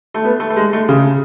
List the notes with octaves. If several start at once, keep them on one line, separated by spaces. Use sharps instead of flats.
A3
B3
A3
A3
G#3
A3
C#3